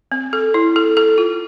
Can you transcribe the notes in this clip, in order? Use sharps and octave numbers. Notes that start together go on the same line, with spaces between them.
C4
A4
E4
A4
A4
F4